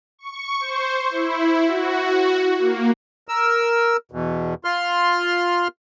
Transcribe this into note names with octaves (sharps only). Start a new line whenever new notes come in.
C#6
C5
E4
F#4
A#3
A#4 E6
E2 B2
F4 C6 F6